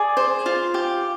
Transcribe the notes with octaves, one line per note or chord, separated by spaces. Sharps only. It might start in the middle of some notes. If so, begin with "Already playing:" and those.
Already playing: G#4 D5
C5
F4
G4